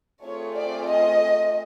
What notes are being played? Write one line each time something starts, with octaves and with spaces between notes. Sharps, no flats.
A3 C4 F4 G#4 C#5
D5
D#5